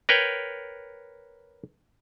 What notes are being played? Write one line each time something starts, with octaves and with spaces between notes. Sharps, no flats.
A#4 B4 C#5 G5